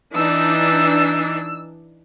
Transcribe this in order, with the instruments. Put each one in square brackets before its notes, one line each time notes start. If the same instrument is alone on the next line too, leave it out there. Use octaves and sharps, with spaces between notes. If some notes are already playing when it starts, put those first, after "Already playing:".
[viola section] E3 D4 D#4 [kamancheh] E6